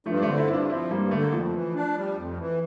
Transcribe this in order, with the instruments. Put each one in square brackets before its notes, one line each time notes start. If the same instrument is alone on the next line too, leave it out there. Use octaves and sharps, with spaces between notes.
[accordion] G2 [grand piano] F3 A3
[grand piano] D4
[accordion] D3 [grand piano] A3 C4
[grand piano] C4 E4
[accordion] G2 [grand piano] E4
[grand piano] D4 F4
[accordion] F3 [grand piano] C4 E4
[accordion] G2 [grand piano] G3 A#3
[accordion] D3 [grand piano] A3
[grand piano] A#3
[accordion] F2 [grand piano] F3 A3
[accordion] E3
D4
G3
F2
E3